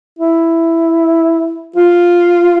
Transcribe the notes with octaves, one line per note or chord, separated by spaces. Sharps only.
E4
F4